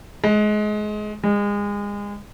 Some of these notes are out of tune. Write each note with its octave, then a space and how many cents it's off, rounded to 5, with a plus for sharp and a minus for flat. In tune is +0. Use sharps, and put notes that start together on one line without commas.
G#3 +25
G#3 -30